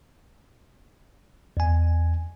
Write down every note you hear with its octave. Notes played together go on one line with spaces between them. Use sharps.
E2 G#5